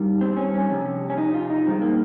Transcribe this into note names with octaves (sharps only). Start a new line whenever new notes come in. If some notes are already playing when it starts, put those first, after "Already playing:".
Already playing: G2 D#3 G3
C4
C#4
C#4
F2 C3
C#4
D#4
F4
D#4
G2 D#3 G#3 C4
A#3